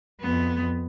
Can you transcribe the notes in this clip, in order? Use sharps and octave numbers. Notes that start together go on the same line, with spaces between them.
F2 B3